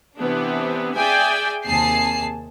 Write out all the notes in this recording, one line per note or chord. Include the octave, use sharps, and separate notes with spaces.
C3 E3 B3 D4
G#4 D5 E5 G5 G#5
D#2 C3 G#4 A5 C7